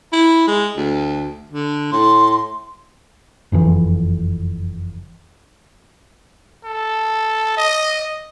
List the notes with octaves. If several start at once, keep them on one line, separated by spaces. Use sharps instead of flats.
E4
G#3
D2
D3
A2 C6
F#1 F2 G#2 E3
A4
D#5